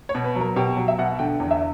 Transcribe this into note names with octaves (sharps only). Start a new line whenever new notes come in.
C#5
B2
B4
F#3
A#4
B2 G4
F#3
E5
B2 F#5
D3 G5
E2
E5